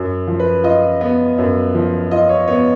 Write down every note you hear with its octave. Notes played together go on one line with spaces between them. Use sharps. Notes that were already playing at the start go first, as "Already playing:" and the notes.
Already playing: F#2
F3
B4
F4 D#5
B3
F#2
F3
F4 D#5
C#5
B3 C#5